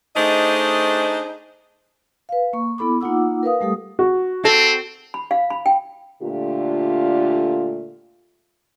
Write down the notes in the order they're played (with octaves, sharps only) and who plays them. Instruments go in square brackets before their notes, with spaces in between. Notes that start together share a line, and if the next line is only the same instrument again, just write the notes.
[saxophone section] A3 D4 D#4 G#4 C5 D#5
[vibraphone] B4 F5
A#3 C#6
B3 E4 A4 B5 D6
A#3 D#4 F4 F#5 D6 E6
A#4 B4 F5 D#6
G3 A3 G4 A4 D#6
[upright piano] F#4
[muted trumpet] C4 [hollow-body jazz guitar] A4
[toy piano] B5
F5
B5
G5
[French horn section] A#2 D3 A3 D4 F4 G4